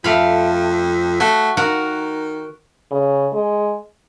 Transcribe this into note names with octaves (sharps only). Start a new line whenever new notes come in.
F2 A3 F5 B5
A3 F#4
D#3 F#4 A#4 F#5
C#3
G#3